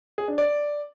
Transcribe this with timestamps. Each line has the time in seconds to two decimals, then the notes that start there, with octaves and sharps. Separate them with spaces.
0.18 G#4
0.28 D4
0.38 D5